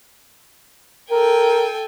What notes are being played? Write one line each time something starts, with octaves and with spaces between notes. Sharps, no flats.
A4 A#4 G5 G#5